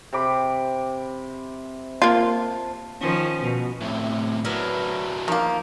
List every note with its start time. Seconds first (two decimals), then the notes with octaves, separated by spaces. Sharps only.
0.13 C3 B5 D6
2.02 A#3 F4 A5
3.00 D#3 F3 C#4
3.42 B2
3.81 A2 C3
4.45 F#3 B3 D4 E4 A#4
5.28 D#3 F3 A#3